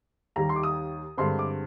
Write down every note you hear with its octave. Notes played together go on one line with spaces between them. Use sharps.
D#2 D#3 G3 A#5
C6
D6
D#6
G2 D3 G#3 C4 C6
D6